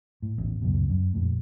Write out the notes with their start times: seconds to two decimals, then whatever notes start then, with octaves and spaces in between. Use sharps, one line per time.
0.22 A2
0.38 A1 E2
0.62 C#2 F#2 B2
0.89 F#2
1.14 F2 A#2 A3